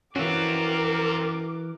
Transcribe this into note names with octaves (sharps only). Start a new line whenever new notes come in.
E3 C4 C#4 F4 F#4 A#4 D6